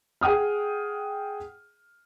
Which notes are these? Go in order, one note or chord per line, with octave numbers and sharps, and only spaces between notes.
G#4 F#5 G5 D#6 F6